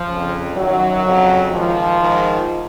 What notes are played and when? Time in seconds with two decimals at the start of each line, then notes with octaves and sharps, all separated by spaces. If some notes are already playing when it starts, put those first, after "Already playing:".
Already playing: F3
0.08 C#3
0.14 F2
0.57 F#2 D#3 F#3
1.05 F2 C#3
1.52 G#2 D#3 F3
1.99 G#2 D#3